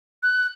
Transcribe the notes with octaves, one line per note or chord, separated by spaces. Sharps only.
F#6